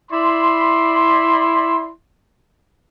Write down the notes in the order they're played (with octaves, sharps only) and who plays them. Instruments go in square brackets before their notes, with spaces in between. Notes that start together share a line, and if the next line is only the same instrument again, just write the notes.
[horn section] E4 D5 B5 C6